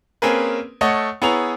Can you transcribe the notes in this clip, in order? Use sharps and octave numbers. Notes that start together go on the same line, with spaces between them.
A#3 C4 C#4 G#4 A#4 B4
A3 A4 C#5 D#5 F#5
B3 E4 G#4 C#5 A#5 F7